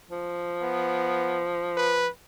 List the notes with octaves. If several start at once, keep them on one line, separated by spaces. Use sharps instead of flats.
F3
B3
B4